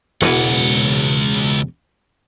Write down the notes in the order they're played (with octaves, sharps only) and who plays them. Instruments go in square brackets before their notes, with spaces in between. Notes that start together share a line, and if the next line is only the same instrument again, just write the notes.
[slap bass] E1 B2 E3 [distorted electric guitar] C#2 F#5